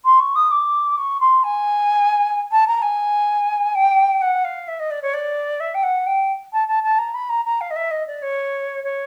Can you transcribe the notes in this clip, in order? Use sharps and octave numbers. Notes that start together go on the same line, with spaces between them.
C6
C#6
D#6
D6
C#6
C6
G#5
A5
A#5
G#5
G5
F#5
F5
E5
D#5
D5
C#5
D5
E5
G5
F#5
G5
A5
A5
A5
A#5
B5
A#5
A#5
F5
D#5
E5
D#5
D5
C#5
C#5